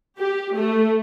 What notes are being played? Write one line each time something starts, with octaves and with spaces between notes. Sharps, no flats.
G4
A3